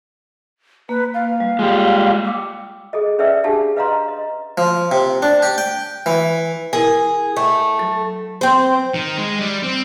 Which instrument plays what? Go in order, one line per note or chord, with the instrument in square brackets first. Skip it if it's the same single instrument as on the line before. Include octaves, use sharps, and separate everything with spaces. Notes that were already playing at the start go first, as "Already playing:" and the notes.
[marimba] A#3 [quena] B4
[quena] F5
[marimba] G3
[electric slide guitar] G#3 G4 [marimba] F4
[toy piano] G5 D6 E6
G#4 A4 D#5
C#4 B4 D5 E5 G5 E6
D4 G4 G#4 F5 F#5 A5
B4 D#5 F5 F#5 A#5 C6
D#5
[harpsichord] F3
C3
D4
G4
G5
E3
[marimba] E4 A#4 [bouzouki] G#4
[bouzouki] A3 [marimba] G5
[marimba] F#3 A4
[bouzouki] C4 C5
[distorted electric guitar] D#3
G#3
G3
C4